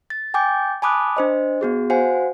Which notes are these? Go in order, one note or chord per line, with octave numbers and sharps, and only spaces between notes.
A6
G5 G#5 D6 G6 A6
G#5 A5 B5 D6 D#6 F#6
D4 C5 D#5
B3 F#4 G#4
F#4 C5 F5 F#5 G#5